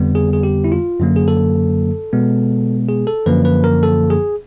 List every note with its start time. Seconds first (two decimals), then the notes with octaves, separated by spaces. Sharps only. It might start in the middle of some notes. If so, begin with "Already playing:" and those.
Already playing: F2 D3 G3 B3
0.15 G#4
0.33 G#4
0.43 G4
0.64 E4
0.72 F4
1.00 F#2 D3 F#3 A#3
1.16 G#4
1.28 A4
2.13 B2 G#3 B3
2.88 G#4
3.07 A4
3.26 F#2 D3 F3 A#3 B4
3.45 B4
3.64 A#4
3.83 A4
4.10 G#4